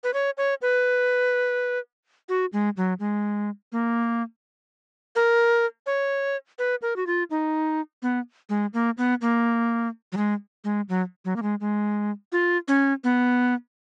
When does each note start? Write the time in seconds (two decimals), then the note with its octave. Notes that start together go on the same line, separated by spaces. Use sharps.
0.04 B4
0.14 C#5
0.38 C#5
0.62 B4
2.29 F#4
2.53 G#3
2.77 F#3
3.00 G#3
3.72 A#3
5.16 A#4
5.86 C#5
6.59 B4
6.82 A#4
6.96 F#4
7.07 F4
7.31 D#4
8.02 B3
8.49 G#3
8.74 A#3
8.98 B3
9.21 A#3
10.12 F#3
10.17 G#3
10.64 G#3
10.89 F#3
11.25 F#3
11.36 A#3
11.42 G#3
11.60 G#3
12.32 F4
12.68 C#4
13.04 B3